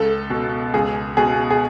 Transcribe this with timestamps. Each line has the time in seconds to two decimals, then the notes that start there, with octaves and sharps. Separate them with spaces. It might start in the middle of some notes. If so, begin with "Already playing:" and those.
Already playing: C#2 A4
0.30 B2
0.74 C#2 G#4
1.17 B2 G#4
1.50 G#4